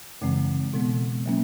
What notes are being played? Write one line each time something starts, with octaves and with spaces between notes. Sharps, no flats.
F#2 C#3 E3 G#3 C4
B2 G#3 B3
F#3 A#3 C#4